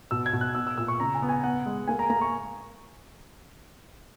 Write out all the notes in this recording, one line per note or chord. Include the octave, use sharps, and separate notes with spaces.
B2 E6
G#6
B2
F#6
B3 E6
E6
A#2 E6
C#6
C#3 A#5
G#5
B3
G#5
B3 F#5
G#3
A#3 G#5
A#5
A#3 A#5
C#6